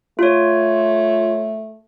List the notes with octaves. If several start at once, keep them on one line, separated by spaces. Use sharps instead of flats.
A3 F4 C#5